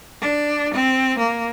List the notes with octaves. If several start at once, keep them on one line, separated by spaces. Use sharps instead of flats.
D4
C4
A#3